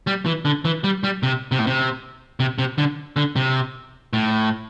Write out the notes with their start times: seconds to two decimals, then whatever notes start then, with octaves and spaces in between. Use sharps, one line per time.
0.07 G3
0.26 E3
0.45 D3
0.65 E3
0.84 G3
1.04 G3
1.23 C3
1.52 C3
1.59 A2
1.67 C3
2.40 C3
2.59 C3
2.78 D3
3.16 D3
3.36 C3
4.13 A2